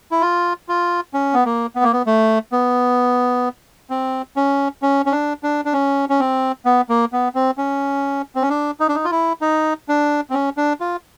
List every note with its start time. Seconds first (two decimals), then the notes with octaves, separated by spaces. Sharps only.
0.11 E4
0.21 F4
0.68 F4
1.14 C#4
1.33 B3
1.45 A#3
1.76 B3
1.83 A#3
1.93 B3
2.06 A3
2.52 B3
3.90 C4
4.36 C#4
4.82 C#4
5.06 C#4
5.12 D4
5.43 D4
5.65 D4
5.73 C#4
6.09 C#4
6.20 C4
6.65 B3
6.89 A#3
7.12 B3
7.35 C4
7.57 C#4
8.35 C4
8.42 C#4
8.50 D4
8.80 D#4
8.88 D4
8.95 D#4
9.05 F4
9.11 E4
9.41 D#4
9.88 D4
10.30 C4
10.34 C#4
10.57 D4
10.80 F4